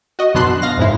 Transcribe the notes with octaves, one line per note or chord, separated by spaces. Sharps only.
F#4 D#5
F#2 B2 B3 D4 C6 F#6
F5 A#6
F2 G#2 C#3 E4